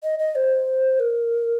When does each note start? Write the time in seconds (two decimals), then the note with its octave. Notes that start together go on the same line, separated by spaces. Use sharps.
0.03 D#5
0.19 D#5
0.35 C5
1.00 A#4